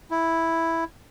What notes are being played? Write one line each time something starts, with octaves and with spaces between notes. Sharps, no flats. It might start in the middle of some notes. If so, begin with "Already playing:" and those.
E4